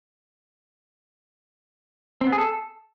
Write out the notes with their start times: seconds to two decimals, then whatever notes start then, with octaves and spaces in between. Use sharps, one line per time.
2.21 C4
2.27 B3
2.32 G#4
2.38 A4